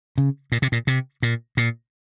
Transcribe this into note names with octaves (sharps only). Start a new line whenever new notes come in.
C#3
A#2
C3
A#2
C3
A#2
A#2